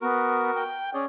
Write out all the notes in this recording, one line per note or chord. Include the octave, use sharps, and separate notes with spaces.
B3 F#4 A#4
G5
C#4 G#4 C#5 D5